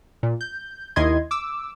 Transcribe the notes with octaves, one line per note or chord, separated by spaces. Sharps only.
A#2
G6
D#2 D#3 E4 D#5 C6 G#6
D6 E6